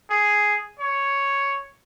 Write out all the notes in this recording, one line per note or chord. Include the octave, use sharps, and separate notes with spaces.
G#4
C#5